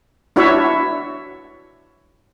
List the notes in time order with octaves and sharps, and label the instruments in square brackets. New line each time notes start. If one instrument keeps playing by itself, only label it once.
[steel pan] D4 E4 F#4 C#5 E5